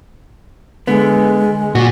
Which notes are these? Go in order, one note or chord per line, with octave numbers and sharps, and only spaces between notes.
D3 G#3 B3
A#2 F#4